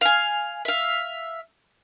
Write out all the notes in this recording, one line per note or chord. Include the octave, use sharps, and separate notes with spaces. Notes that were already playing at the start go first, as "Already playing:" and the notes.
F5 G#5
E5 F5